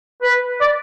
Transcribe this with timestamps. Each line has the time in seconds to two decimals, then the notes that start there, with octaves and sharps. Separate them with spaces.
0.23 B4
0.61 D5